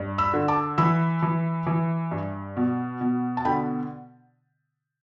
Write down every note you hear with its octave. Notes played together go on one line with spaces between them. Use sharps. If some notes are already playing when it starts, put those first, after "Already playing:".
Already playing: G2
B5 E6
D3
A5 D6
E3 B5 E6
E3
E3
G2
B2
B2
A5
D3 G5 B5